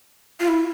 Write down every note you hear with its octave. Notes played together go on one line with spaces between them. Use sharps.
F4
E4